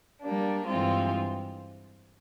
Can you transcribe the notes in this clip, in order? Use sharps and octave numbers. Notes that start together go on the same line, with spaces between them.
G3 A#3 D4
G2 E3 G#3 C4 F4